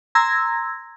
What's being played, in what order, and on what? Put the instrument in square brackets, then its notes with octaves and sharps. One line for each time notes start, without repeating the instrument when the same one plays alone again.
[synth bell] A#5 C6 E6 G#6 A#6